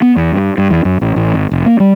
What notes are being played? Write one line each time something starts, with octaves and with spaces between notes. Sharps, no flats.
B3
E2
G2
G2
E2
F#2
A1
A1
G#1
F1
A#3
G3